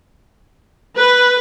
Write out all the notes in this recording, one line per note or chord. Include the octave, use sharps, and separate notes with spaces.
B4